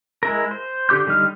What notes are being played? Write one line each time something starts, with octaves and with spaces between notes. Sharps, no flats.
G#3 E4 A#4
C5
D3 G4 D6 G6
D3 G3 D#4 F6